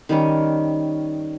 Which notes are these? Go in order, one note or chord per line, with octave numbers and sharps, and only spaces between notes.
D#3 G3 C#4